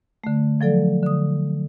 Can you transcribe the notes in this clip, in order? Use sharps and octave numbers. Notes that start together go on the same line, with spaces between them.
D3 A3
F3 F#3 A4 D5
D3 D#6